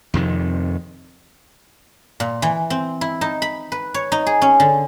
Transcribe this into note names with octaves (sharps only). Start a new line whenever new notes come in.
F2 C3 D#3
A#2
E3
C4
E4
D#4
B5
B4
C#5
D#4
G#4
C#4
D3